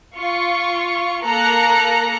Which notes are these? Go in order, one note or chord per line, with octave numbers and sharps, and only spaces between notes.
F4 C#6
A#3 A4 A#4 A#5 F#6 C#7